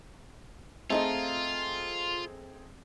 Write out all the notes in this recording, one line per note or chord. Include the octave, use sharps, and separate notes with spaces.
A3 C4 D#4 F4 G#4 D#5 A5